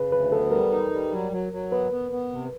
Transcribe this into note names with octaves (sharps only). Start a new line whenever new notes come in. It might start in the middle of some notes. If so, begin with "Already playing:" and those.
Already playing: C#3 B4
D2 B4
B3 A4
G3 A#4
D#4
G3
F#3
F#3
F#3
B3 B4
B3
B3
C3